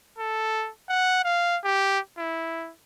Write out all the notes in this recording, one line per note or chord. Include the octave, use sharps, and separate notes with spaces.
A4
F#5
F5
G4
E4